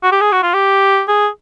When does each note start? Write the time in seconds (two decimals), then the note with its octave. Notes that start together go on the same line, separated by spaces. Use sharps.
0.03 F#4
0.12 G4
0.21 G#4
0.32 F#4
0.43 F4
0.54 G4
1.08 G#4